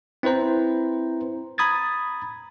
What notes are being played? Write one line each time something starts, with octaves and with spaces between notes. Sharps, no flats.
C4 E4 B4 C5 A#5
A#5 B5 D#6 G#6 A6